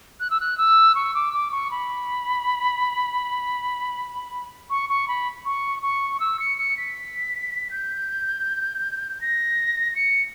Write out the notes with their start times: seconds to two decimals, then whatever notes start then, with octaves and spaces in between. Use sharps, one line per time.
0.20 F#6
0.30 E6
0.40 F#6
0.58 E6
0.95 C#6
1.14 D6
1.33 D6
1.51 C#6
1.71 B5
4.70 C#6
4.89 C#6
5.08 B5
5.46 C#6
5.83 C#6
6.20 E6
6.40 C#7
6.58 C#7
6.77 B6
7.71 G6
9.21 A#6
9.95 C#7